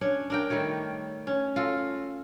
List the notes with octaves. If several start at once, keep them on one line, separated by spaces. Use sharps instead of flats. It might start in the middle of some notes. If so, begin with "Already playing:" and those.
C#4 D4 C#5
D4 A#4 G5
D#3 G3 A3 C#5
C#4
F4 F#4 A4